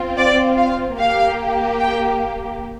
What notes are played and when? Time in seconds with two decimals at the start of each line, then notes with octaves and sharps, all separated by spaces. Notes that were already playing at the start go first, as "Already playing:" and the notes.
Already playing: C4 F4
0.17 D5
0.58 F5
0.99 A#3 G4 F5
1.80 G5